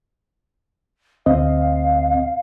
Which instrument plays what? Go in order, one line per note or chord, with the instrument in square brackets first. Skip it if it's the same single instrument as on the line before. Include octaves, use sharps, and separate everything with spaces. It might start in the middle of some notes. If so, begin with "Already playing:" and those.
[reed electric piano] D2 C4 D#5 [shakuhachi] F5